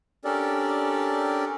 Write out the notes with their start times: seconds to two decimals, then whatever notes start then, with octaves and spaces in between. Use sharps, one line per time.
0.25 C#4 D4 G4 A4 A#4 D5